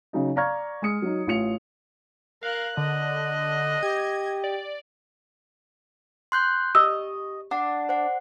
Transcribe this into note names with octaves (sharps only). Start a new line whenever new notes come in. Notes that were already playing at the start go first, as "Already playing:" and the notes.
C#3 F#3 D#4
D5 F5 A#5 C#6 F6 G#6
G#3 D#6 C#7
F#3 D#4
A1 F4 C#5 C#7 F7
A#4 F5 F#6
D3 D#5
G4 G#6
D5
C6 F#6 G6
G4 D#5 E6
D4 F#5
C5 F#5